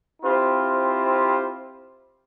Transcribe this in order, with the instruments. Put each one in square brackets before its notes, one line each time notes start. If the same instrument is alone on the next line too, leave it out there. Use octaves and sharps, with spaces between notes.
[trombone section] C4 E4 F4 G4 C5